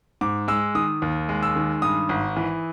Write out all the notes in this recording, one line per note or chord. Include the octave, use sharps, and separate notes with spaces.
G#2 D6
G#3 E6
D#3 D#6
D#2
G#3
E6
D#3
G2 D#6
G#1
E3